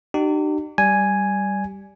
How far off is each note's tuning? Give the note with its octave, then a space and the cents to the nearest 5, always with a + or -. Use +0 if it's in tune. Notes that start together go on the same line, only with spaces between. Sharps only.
D#4 -45 G4 -35
G3 -5 D5 +0 G#5 +0